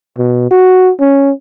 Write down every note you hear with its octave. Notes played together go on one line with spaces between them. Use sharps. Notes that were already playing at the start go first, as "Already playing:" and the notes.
B2
F#4
C#4